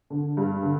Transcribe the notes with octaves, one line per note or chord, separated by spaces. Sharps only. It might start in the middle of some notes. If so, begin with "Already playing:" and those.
D3
G2
D3